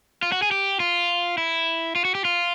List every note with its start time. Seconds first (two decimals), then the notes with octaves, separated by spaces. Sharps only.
0.23 F4
0.32 F#4
0.42 G#4
0.51 G4
0.80 F4
1.38 E4
1.96 F4
2.05 F#4
2.15 G4
2.25 F4